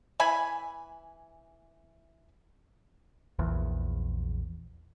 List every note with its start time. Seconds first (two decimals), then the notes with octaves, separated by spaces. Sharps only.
0.20 E3 E5 G#5 B5
3.39 A#1 E2